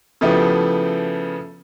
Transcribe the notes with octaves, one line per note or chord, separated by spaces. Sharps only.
C#3 F3 A3 B3 E4 G4